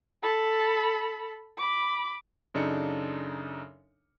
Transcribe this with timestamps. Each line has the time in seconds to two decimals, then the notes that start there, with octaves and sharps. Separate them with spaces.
0.23 A4 B5
1.58 B5 D6
2.54 F#2 C#3 D4 D#4 A4 C#7